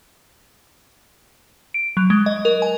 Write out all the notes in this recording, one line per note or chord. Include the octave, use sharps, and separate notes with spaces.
D7
F#3
G#3
D#5
A#4
G#5